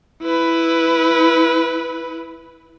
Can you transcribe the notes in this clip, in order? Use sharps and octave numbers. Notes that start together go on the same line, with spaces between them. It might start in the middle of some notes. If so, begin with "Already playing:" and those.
E4 B4